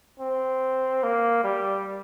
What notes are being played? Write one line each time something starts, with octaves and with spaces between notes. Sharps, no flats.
C4
A#3
G3